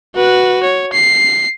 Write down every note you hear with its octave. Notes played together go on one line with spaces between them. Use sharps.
F#4 B4
C#5
C7